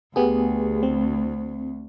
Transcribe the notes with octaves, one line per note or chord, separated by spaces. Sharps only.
D2 B3 G4 G#4
C4